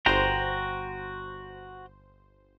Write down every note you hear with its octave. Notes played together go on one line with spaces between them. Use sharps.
G1 F#4 C5 G5 A#5